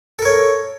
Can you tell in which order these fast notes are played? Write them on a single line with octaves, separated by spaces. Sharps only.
A4 A#4 C#5